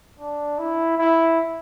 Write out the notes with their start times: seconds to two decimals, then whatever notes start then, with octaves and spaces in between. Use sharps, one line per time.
0.19 D4
0.59 E4
0.98 E4